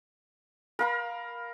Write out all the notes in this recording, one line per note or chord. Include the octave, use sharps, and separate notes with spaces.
A#4 F5 B5